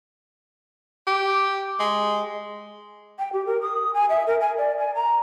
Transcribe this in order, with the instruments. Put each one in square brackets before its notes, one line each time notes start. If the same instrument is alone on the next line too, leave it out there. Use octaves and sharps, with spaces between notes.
[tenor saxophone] G4
G#3
[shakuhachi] G5
G4
A#4
D#6
G#5
E5
A#4
G#5
D5
G#5
A#5